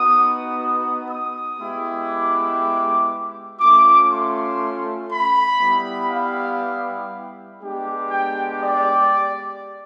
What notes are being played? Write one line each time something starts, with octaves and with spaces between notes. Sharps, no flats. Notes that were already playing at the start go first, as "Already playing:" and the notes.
Already playing: B3 D#4 F#4 D#6
D#6
D#6
G#3 B3 E4 G4
D6
A3 C#4 F4 D6
C6
B5
G3 B3 E4 G4
F5
G#3 B3 D4 G4
G5
D5